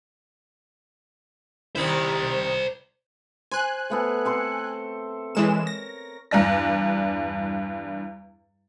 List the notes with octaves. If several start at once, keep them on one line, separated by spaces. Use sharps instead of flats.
C3 D#3 E4 C5 D5
C5 G#5 F#6
A3 B3 A4
C4 A4 C6
E3 G#3 A#4 C#5 E7
A#6
E2 G2 D4 A#6